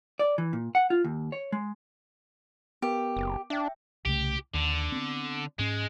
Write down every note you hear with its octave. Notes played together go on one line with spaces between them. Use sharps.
D5
E3
A#2
F#5
F4
D#2
C#5
G#3
B3 G4 A#4
F#1
D4 E5 G5
C2 C#3 A3 G4
D#2 D3
B3 C4
G#2 G#3 C#4